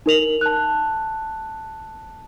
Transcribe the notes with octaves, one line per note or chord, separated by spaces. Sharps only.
D#4 A#4 F7 F#7
A5 F#6